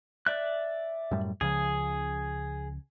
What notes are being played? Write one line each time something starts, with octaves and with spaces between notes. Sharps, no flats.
D5 E5 F#6
F#2 A2 G3
C#2 C#3 F3 G#4